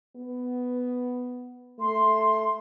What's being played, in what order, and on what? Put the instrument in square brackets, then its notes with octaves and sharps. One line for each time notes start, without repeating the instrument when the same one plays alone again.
[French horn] B3
[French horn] A3 [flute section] C6